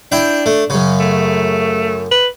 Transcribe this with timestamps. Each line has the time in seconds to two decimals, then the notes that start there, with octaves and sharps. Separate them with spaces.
0.12 D4 E4 G5
0.46 A3
0.70 F#2 C#3
1.00 A3
2.11 B4